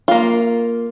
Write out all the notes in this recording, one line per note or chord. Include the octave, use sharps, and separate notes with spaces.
A#3 F4